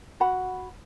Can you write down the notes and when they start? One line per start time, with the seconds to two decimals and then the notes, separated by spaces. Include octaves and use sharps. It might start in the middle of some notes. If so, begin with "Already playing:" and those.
0.20 F#4 F#5 B5